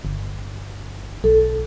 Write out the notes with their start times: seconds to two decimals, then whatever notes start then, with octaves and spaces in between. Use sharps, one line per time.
0.05 G1
1.24 B1 A4